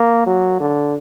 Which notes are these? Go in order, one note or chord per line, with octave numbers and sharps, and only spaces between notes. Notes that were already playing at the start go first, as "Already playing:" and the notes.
Already playing: A#3
F#3
D3